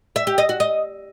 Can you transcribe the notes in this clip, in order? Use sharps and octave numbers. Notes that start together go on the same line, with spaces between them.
E5
G4
D#5
F#4
D#5